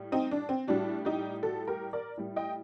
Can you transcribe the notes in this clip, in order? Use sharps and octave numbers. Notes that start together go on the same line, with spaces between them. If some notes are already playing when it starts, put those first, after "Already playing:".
Already playing: A2 G3
C4 D#4
D4
C4
A2 G3 D4 F#4
D#4 G4
F#4 A4
G4 A#4
A#4 D5
A2 G3
D#5 G5